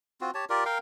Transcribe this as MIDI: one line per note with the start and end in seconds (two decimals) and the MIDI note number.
0.21 0.31 60
0.21 0.31 65
0.21 0.31 66
0.34 0.45 67
0.34 0.45 73
0.34 0.45 81
0.50 0.64 65
0.50 0.64 67
0.50 0.64 70
0.50 0.64 74
0.65 0.78 70
0.65 0.78 77
0.65 0.78 79